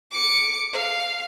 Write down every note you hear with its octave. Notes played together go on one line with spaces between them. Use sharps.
D6 C#7
F5